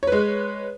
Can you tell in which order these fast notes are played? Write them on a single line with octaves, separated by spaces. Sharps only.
C#5 B4 G#3